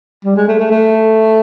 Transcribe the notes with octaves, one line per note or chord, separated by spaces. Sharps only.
G3
G#3
A3
A3
A3